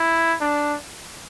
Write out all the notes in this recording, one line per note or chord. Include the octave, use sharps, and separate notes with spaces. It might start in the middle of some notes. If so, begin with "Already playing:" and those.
Already playing: E4
D4